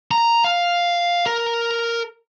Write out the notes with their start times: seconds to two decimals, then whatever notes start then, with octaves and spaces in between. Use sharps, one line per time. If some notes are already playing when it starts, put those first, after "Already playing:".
0.11 A#5
0.44 F5
1.26 A#4